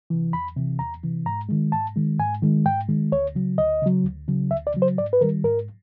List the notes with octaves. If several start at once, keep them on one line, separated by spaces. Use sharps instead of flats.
C3 E3
E2 B5
C3 E3
E2 A#5
C3 E3
G#2 A#5
D#3 G#3
G#2 A5
D#3 G#3
G#2 G#5
D#3 G#3
G#2 G5
D#3 G#3
D2 C#5
C#3 F#3
D2 D#5
C#3 F#3
D2
C#3 F#3
D2 E5
D5
C#3 F#3
C5
G#2 D5
B4
D#3 G3 A#4
G#2 A#4